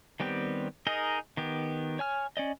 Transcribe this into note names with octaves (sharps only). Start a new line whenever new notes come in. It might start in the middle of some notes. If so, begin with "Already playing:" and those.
D#3 G3 B3 C4 G4
D#4 G#4 A#4 D#5
D#3 B3 G4
C#5 G#5 F6
C#4 D5 D#5